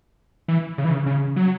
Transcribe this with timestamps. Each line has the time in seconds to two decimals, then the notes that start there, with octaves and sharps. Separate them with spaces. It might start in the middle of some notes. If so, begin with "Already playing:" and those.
0.48 E3
0.78 C#3
0.84 E3
0.92 C#3
1.06 C#3
1.36 F#3